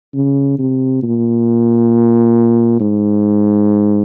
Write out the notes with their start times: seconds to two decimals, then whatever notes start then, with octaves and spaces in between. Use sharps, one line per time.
0.15 C#3
0.59 C3
1.03 A#2
2.80 G#2